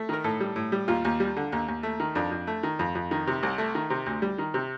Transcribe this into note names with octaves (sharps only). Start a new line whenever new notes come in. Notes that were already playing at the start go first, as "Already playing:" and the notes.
Already playing: A3
D#3 A#4
A2 A4
G3
A2
G3
D#2 F4
D#2
G3
D3
D#2
D#2
A3
D#3
F2 D4
F2
A3
D#3
F2
F2
D#3
C3
C2
A3
D#3
C3
D2
G3
D#3
C3